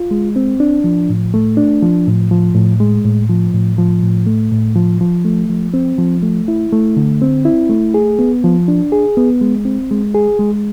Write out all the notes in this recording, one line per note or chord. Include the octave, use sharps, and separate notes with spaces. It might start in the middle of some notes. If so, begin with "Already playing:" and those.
Already playing: F4
G#3
C4
D4
F3
A2
A3
D4
F3
A2
F3
A2
G#3
A2
F3
A2
F3
A2
A3
A2
F3
F3
A3
F3
C4
F3
A3
E4
A3
D3
C4
E4
A3
G#4
B3
F3
D4
G#4
B3
G#3
C4
G#3
G#4
G#3